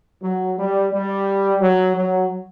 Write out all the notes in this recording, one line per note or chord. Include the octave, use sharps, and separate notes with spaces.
F#3
G3
G3
F#3
F#3